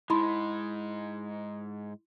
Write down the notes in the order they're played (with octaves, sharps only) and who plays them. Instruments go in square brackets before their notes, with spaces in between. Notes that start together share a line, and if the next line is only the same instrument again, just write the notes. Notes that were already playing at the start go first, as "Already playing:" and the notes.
[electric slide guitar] G#2 G#3 [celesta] E4 B5 C6